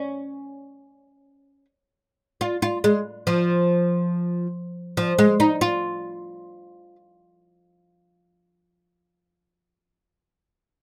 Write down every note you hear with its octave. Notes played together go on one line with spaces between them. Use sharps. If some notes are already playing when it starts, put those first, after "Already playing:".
Already playing: C#4
F4
F4
G#3
F3
F3
G#3
D#4
F4